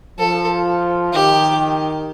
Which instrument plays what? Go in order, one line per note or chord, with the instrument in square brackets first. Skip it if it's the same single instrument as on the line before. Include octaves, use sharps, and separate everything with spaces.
[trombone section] F3 [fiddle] A4
[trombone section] D#3 [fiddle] G4